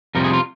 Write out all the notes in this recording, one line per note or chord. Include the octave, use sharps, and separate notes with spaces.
F2 C3 G3 A#4
G#4
F4